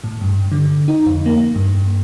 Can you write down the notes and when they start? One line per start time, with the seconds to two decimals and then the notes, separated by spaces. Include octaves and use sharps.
0.04 A2
0.21 G2
0.52 D3
0.88 D#4
1.06 F2
1.26 A#3
1.56 G2